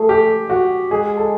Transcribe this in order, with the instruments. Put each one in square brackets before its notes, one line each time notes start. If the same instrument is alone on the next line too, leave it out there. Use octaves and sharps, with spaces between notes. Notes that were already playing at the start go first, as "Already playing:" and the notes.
Already playing: [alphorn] A3 [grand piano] G#4
[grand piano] G4
F#4
[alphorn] G#3 [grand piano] G#4
[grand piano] A4